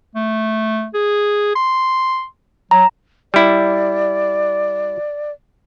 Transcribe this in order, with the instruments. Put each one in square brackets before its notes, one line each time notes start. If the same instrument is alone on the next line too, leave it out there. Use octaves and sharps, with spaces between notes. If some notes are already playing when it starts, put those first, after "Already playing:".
[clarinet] A3
G#4
C6
[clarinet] F#3 [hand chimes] A#5
[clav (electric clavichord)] G3 E4 [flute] D5